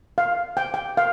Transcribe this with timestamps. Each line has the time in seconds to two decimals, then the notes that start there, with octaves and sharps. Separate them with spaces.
0.18 F5
0.57 G5
0.74 G5
0.97 F5